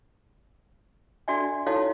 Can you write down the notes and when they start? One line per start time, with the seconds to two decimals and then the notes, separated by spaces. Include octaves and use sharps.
1.28 D4 F#4 A4 D5 E5 G#5
1.66 D#4 E4 F#4 A4 C#5 F5